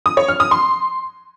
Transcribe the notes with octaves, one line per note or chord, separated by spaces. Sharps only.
D#6
C#5
F6
D#6
C6